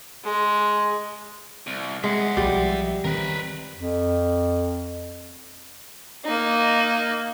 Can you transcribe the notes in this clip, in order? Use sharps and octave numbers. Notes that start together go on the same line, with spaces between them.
G#3
C2
G#3 E5 F#5
B1 F3 G3
D#3 C4 A#4 B4
F2
A#3 D#4